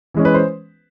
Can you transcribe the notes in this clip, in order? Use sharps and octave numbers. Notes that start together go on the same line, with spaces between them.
E3 G#3 C#4
B4
C5